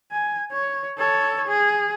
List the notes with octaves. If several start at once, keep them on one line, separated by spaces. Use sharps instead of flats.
G#5
C#5
A4 C#5
G#4